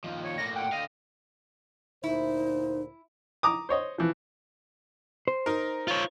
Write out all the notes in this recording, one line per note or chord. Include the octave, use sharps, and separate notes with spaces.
D#2 F3
C#5
A2 A#3 A#6
F#5 G5
D3 D#5 F5
D2 A#2 D#4 E4 C5
A#5 D6 D#6
C5 C#5 D#5
E3 F3
C5
D#4 A#4
F4 C#5